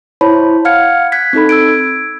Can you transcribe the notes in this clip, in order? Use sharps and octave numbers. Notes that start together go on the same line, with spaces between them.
E4 C5 C#5 A5 B5
F5 F#5 F6 G#6 C#7
F#6 G#6 B6
C4 D#4 A4 B5
E6 G#6 D7